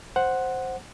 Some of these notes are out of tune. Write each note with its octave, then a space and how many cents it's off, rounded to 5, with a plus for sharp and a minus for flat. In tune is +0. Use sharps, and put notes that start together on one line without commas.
C5 +5 F#5 +0